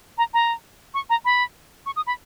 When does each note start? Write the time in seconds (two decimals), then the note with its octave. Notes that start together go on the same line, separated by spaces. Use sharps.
0.18 A#5
0.34 A#5
0.94 C#6
1.10 A#5
1.25 B5
1.86 C#6
1.96 D#6
2.07 B5